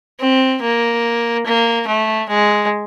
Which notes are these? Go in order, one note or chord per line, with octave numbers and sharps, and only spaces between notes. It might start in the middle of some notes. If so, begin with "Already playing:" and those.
C4
A#3
A#3
A3
G#3